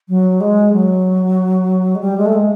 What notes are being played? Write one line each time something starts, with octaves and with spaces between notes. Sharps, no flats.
F#3
G#3
F#3
G#3
G3
G#3
A3
G#3